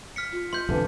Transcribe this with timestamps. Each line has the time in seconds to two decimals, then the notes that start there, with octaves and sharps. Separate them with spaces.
0.16 F6 B6 C#7
0.32 F4
0.53 D#5 C6 G6
0.69 B1 F2 D3 E3 B3